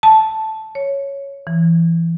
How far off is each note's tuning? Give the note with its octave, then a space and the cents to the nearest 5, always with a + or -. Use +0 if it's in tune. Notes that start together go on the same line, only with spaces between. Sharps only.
A5 -5
C#5 +0
E3 +20